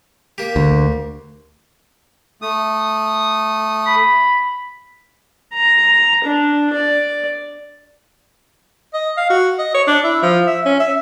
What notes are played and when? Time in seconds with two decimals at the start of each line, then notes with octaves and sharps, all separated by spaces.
0.38 A#3 G4
0.56 D2
2.42 A3 D#6
3.87 B5
5.54 A#5
6.24 D4
6.74 D5
8.94 D#5
9.17 F5
9.30 F#4
9.58 D#5
9.74 C#5
9.87 D4
10.04 E4
10.22 F3
10.47 E5
10.66 C#4
10.80 E5